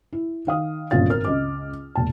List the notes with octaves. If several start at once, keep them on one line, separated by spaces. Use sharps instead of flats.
E4
D#3 F5 D#6
G1 F#2 A#2 F4 F5 A6
G#1 A#4 F6
C#2 D#5 D6
E1 A#2 A5